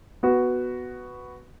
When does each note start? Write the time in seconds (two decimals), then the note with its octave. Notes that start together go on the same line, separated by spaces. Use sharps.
0.23 B3 F#4